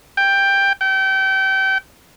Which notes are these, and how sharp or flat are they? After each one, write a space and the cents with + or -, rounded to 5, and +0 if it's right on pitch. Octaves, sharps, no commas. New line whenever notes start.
G5 +10
G5 -30